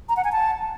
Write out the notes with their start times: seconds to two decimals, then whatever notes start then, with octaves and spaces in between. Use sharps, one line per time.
0.09 A#5
0.17 F#5
0.24 G#5
0.32 A5